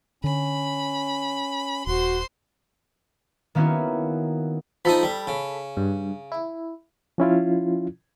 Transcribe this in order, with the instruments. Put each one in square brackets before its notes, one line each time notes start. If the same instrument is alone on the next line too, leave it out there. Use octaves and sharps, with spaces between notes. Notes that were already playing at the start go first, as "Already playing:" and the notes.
[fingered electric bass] D3 [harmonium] C#4 [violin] B5
[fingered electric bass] D#1 [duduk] F#4 [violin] C5 C6
[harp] D#3 A#3 B3 C#4 E4 F#4
[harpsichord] F3 D#4 [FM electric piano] A4 B5
[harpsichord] G3
C#3
[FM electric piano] G2
E4
[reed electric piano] F3 C#4 E4 F4